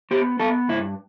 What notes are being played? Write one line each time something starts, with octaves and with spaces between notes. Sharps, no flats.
B3 G4
B3 A4
G2 E4